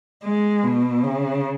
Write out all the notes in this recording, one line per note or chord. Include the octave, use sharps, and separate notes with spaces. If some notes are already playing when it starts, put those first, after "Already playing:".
G#3
B2
C#3